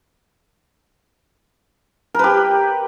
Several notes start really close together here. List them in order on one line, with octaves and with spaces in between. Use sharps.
A#4 B4 G4